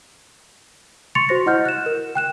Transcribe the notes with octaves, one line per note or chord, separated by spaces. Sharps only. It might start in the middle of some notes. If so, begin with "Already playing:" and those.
C6 C#6 A6 C#7 F7
F#4 C5 A#6
E4 D#5 F#5 F6 G6
F#6 E7
A#4
G5 F#6 E7